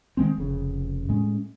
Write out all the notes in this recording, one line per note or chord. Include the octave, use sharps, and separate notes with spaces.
D#3 G#3 C4
F1 C#3
A2 G#3 C#4